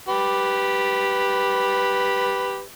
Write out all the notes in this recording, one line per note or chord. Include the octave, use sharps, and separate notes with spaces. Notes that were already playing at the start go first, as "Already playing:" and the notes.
G4 B4